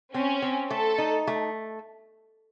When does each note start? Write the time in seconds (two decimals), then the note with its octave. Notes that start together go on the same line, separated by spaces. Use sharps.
0.14 C4 C#4
0.42 C4
0.70 A3 A4
0.98 D#4
1.27 A3